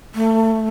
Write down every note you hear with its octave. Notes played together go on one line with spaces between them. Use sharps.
A3